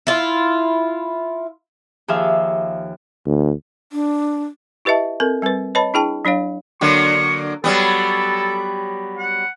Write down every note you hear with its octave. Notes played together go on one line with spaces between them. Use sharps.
E4 F4
D#2 F3 G#4 E5 F5
D2
D4
E4 G4 B4 D#5 E5 A5
C4 A4 A#4
G3 C4 A#4 B4
B4 C#5 D#5 A5 B5
D4 E4 G#4 G5 A5
F#3 D4 C#5 F5
D3 F#3 A#3 C#6
F#3 G3 B3 A4
F#5